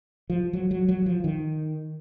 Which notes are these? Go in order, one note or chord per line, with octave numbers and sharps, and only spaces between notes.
F3
F#3
F#3
F#3
F3
D#3